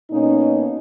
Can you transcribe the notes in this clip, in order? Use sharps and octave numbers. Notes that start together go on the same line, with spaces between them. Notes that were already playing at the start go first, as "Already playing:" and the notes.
B2 A#3 C#4 D#4